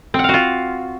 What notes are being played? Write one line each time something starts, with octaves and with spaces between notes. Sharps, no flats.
C4 F4 F#4 F5 F#5